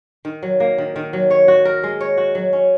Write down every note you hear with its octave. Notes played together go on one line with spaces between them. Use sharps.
D#3
F#3
A#3
D#3
D#3
F#3
C#5
F#4
A#4
G#3
C#5
F#4
F#3
C#4